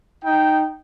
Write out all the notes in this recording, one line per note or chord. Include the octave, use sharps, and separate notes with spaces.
D#4 G5